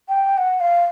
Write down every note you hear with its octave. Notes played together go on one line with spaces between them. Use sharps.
G5
F#5
F5